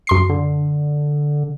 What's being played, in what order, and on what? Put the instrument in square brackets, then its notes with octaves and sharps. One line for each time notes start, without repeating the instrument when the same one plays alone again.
[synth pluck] F#2 C6 C7
[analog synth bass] D3